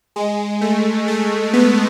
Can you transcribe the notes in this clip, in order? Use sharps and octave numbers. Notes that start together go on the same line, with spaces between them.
G#3
A3
A3
B3